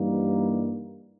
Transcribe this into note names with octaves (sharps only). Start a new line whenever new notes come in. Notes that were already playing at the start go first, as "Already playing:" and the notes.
Already playing: G2 E3 G3 A#3 D#4